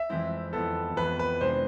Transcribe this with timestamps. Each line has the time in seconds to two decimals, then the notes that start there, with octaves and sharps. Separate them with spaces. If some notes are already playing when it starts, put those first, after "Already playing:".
Already playing: E5
0.09 F2 E3 G#3 C4 E4
0.53 F2 E3 B3 A4
0.96 F2 E3 B3 B4
1.19 B4
1.40 C3 G#3 D4 C5